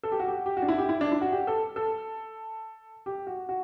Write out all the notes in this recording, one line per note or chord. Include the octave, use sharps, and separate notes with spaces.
A4
G4
F#4
G4
G4
F#4
D4
E4
G4
E4
D4
E4
F#4
G4
A4
A4
G4
F#4
F#4